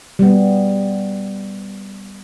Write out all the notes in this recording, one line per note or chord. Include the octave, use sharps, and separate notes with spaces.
G3 B3